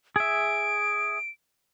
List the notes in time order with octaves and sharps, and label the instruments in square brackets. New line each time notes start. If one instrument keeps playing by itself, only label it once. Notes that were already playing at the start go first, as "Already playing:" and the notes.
[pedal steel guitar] G#4 E5 [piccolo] D7